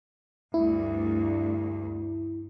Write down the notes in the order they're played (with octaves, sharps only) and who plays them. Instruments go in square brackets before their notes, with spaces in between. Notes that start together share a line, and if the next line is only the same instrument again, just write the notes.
[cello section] D2 G2 [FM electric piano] E4